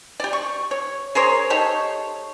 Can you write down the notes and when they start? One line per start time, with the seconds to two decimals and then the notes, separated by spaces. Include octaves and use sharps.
0.20 G4 D5
0.33 C#6
0.71 C#5
1.15 G#4 A#4 C5 C#5
1.50 D#4 G4 A4 C#5